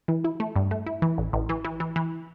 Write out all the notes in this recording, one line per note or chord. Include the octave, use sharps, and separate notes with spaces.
E3
E4
A3
G2
A3
E4
E3
A1
A1
E3
E3
E3
E3